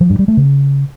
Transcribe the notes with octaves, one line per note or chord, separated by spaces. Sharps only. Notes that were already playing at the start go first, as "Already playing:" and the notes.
F3
G2
G3
A3
C#3